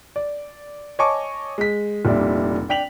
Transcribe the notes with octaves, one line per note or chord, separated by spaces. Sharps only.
D5
C#5 D#5 G#5 A5 C#6 D6
G#3 B6
F1 A#2 G3 D4 E4
D4 G5 B6 F7 F#7